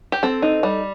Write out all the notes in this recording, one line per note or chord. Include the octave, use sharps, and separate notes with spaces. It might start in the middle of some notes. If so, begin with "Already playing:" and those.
G4
C4 A4
D#4
G3